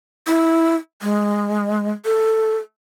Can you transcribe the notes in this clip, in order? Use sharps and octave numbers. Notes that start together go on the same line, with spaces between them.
E4
G#3
A4